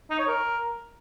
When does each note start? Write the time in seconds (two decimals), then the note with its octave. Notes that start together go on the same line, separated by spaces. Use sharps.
0.10 D#4
0.19 C#5
0.27 A#4